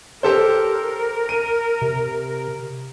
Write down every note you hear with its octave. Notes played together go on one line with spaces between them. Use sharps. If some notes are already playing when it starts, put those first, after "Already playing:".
G4 A4 A#4 C5
D#7
C3